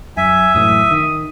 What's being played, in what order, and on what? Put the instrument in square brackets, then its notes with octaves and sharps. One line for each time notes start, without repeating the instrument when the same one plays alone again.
[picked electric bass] F#2 [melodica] E5 [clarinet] G#5
[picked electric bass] F#2 A2 E3 [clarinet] D#6
[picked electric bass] D#3